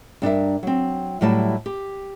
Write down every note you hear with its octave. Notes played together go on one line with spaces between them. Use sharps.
G2 D4 A#4 E5
F#3 C4
A2 F#3 G3 E4 A5
G4